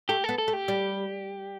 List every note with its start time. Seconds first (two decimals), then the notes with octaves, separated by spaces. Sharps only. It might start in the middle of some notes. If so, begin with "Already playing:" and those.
0.09 A3 G4
0.24 B3 A4
0.38 A4
0.48 A3
0.53 G4
0.68 G3